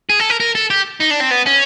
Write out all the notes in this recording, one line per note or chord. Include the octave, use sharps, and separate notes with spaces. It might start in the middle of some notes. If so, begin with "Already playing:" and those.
G#4
A4
A#4
A#4
A4
G4
D#4
D4
C4
B3
C#4